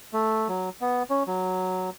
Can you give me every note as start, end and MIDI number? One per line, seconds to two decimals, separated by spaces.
0.13 0.48 57
0.48 0.69 54
0.81 1.03 59
1.10 1.23 61
1.27 1.90 54